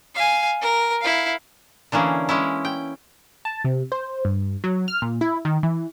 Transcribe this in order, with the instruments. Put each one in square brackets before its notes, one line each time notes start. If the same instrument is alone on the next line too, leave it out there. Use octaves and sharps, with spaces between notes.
[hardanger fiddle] F5 G#5
A#4
E4 F5
[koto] D3 E3 A#3 C#4 G#4
G#3 C#4 E4
G5
[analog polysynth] A5
C3
C5
G2
F#3
F6
A#2
E4
D#3
E3